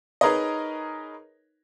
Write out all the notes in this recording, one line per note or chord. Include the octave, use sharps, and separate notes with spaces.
D#4 G#4 A#4 B4 C#5 D#5